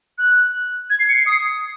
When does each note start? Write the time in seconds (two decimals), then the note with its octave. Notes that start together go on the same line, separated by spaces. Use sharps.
0.18 F#6
0.90 G#6
1.00 C7
1.09 C#7
1.18 C7
1.26 D#6